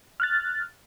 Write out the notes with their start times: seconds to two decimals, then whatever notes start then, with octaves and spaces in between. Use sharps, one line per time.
0.20 F6 F#6 A6